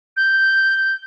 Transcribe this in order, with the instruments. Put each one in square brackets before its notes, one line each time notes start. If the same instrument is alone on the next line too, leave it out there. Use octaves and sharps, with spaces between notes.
[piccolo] G6